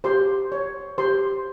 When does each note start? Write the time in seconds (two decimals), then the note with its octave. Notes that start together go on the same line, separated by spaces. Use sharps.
0.04 G4 C5 C6
0.52 C#5
0.98 G4 C5 C6